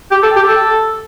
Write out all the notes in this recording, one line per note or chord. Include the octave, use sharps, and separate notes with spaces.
G4
A4
G4
A4